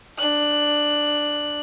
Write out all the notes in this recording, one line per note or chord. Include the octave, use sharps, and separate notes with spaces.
D4 F#6